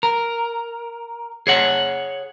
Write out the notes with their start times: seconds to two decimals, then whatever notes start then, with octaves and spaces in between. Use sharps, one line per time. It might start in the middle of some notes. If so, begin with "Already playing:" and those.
0.03 A#4
1.47 G#4 C#5 F#5